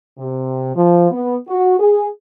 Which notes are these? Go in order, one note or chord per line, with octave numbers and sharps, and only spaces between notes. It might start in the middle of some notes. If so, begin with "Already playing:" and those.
C3
F3
B3
F#4
G#4